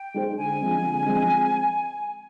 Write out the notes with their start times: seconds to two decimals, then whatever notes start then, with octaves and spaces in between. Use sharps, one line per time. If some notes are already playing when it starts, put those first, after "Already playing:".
Already playing: G5
0.14 G#3 D#4 G#4 C5
0.37 D3 G#5
0.61 F3 G#3 C4
0.83 D3
1.06 F3 G#3 C4